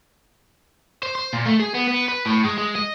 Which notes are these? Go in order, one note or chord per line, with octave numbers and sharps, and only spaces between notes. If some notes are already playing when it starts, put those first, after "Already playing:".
C5
C5
A#2
A3
G#4
B3
B3
B4
A2
G#3
G#3
D#5